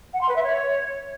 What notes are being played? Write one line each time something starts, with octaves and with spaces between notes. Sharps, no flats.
F#5
C6
B4
E5
C#5